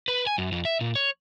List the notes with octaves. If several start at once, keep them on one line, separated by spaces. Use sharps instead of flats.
B4
G#5
F#2
F2
E5
A#2
C#5